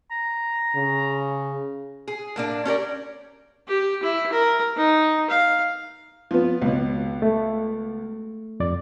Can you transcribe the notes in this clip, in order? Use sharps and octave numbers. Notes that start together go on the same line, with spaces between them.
A#5
C#3
G#4
A2 A#3 D4
C#4 G4 A#4 D5
G4
E4
A#4
D#4
F5
F3 B3
C#2 B2
A3
F2 D5